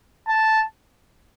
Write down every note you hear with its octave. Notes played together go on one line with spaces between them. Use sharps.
A5